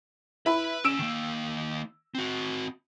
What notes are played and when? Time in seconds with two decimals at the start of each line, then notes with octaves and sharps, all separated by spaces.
0.46 E4 B4 B5
0.85 D2 C#4 E6 D7 E7
0.99 D#3 A#3
2.15 C4 F#4